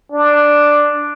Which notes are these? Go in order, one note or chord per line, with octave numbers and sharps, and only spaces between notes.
D4